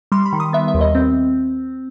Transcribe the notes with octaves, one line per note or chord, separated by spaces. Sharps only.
G3 C6
B5
D#3
D#6
B3 E5
E5
D#2
D#5
C4